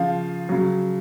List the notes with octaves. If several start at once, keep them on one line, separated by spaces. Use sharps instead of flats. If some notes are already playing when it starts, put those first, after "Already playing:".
Already playing: C#3 F3 F5
C#3 F#3